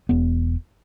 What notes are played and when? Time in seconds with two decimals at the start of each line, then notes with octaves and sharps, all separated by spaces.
0.09 E1 B3